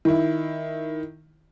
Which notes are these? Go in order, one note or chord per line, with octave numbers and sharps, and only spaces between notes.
D#3 E4